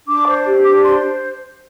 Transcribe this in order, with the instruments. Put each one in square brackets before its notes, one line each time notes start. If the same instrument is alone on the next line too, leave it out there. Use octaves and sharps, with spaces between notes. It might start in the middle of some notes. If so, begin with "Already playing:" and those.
[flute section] D4 D6
C5
G4
D4 D6
C5 C6